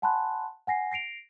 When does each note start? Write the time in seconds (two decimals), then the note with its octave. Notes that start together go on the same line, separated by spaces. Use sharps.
0.02 F#5 G#5 A5 B5 C6 F#6
0.67 F#5 G#5 A#6 C7
0.92 A#6 C7 D7 F7